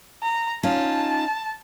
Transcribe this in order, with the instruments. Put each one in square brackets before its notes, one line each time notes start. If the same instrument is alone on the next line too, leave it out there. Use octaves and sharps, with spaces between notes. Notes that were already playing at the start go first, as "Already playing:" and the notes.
[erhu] A#5
[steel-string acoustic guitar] C#4 D#4 F4 [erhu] A5